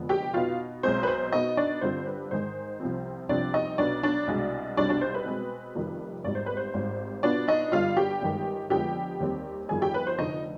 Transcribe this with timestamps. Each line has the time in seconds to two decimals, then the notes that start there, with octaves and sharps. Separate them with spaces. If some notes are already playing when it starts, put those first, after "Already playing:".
Already playing: F1 F2 D3 G#3 B3
0.09 G4 G5
0.34 B2 B3 D#4 F4 F5
0.83 B1 B2 G#3 C4 C5
1.03 B4
1.07 C5
1.32 B2 B3 D#4 D#5
1.57 D4 D5
1.81 G2 D3 G3 C4 F4 C5
2.06 B4
2.31 G#2 D#3 G#3 C5
2.80 C2 C3 F3 C4
3.29 C2 C3 F3 C4 D4 D5
3.54 D#4 D#5
3.78 B1 B2 B3 D4 D5
4.03 D4 D5
4.27 C2 B2 G#3 D4
4.77 C2 B2 G3 C4 D4 D#4 D5
4.89 D4 D5
5.01 C5
5.14 B4
5.26 B2 G#3 C4
5.75 F1 F2 D#3 G3
6.24 G#1 G#2 G3 D5
6.35 C5
6.46 B4
6.57 C5
6.74 G#1 G#2 G3
7.23 B2 B3 D4 F4 D5
7.48 D#4 D#5
7.72 G2 D3 G3 F4 F5
7.97 G4 G5
8.22 G1 G2 D#3 G#3
8.70 F2 D3 F3 G#3 B3 G4 G5
9.20 D#2 D#3 G3 C4
9.69 G1 F2 D#3 G3 G#4 G#5
9.82 G4 G5
9.94 B4
10.07 C5
10.18 F1 F2 D3 D#4 D#5